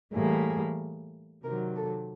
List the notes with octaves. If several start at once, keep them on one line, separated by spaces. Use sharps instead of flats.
A2 E3 G3 A#3 G#4
C3 D#3 F#3 A#4
A4